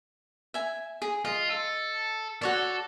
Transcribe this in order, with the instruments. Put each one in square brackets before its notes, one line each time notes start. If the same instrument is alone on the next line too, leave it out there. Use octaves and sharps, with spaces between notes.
[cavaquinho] E5 G#5
G#4
[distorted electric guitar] F4 [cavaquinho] D#5
[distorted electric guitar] A4
[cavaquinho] F#4 C#5 D5 [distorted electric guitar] A4